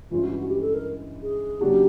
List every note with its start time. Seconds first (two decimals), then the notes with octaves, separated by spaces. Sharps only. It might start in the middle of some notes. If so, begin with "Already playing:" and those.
0.11 G2 E3 G#3 C#4 E4 F4
0.23 F#4
0.35 F#4
0.48 G4
0.61 A4
0.74 A#4
1.23 G#4
1.61 C#3 F#3 A#3 D4 F#4 G4